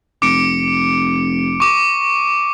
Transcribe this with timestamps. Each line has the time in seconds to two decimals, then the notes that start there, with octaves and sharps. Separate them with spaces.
0.22 F1 D6 C#7 D7
1.60 C#6 D6